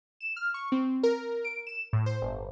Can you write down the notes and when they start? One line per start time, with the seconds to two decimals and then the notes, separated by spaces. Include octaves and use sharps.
0.21 E7
0.36 F6
0.54 C#6
0.72 C4
1.03 A#4
1.44 D7
1.67 E7
1.93 A2
2.06 C5
2.22 G1